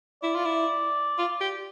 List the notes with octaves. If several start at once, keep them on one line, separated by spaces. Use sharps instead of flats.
E4 D5
F4
E4
F4
G4